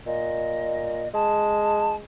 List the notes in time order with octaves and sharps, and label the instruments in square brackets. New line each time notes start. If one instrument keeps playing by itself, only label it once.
[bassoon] A#2 [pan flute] D#5
[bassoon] G#3 [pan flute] A5